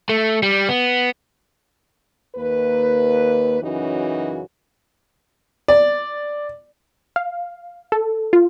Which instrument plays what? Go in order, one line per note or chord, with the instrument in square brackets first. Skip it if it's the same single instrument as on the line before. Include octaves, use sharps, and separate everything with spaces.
[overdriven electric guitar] A3
G3
B3
[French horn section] D#2 A#3 B4
F#2 C#3 E3 C#4 D#4 F#4
[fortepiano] D5
[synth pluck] F5
A4
F4